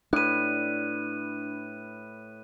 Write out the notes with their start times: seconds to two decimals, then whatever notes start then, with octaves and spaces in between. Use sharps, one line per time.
0.13 A2 D4 B4 F#6 D#7